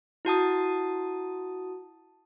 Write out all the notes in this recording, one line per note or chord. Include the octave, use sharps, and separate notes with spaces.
E4 F#4 A5 D#6